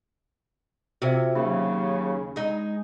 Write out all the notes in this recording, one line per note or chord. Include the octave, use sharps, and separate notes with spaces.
C3 F4 F#4 G#4 C5 E5
D#2 C#3 F#3 B5
G#3 D#4 G#4